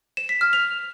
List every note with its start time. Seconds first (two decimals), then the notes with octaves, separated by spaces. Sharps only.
0.17 E7
0.29 B6
0.41 F6
0.53 F7